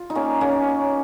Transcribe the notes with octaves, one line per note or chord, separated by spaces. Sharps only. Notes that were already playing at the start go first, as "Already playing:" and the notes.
Already playing: F4
D#4
A#3 C#4
A#3 C#4